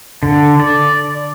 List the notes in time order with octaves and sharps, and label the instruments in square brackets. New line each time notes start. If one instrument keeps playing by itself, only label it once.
[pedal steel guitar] D3
D5